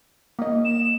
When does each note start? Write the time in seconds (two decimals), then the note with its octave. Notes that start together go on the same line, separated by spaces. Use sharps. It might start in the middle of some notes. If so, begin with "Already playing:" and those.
0.39 A#3 D#5
0.65 E7